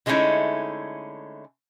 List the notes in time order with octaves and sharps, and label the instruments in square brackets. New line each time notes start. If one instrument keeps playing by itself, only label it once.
[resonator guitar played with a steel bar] D3 G#3 A3 C#4 D#4 E4